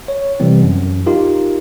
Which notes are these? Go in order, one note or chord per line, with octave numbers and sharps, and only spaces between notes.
C#5
C3 E3 G3 C4
F#2
D#4 F4 G4 A#4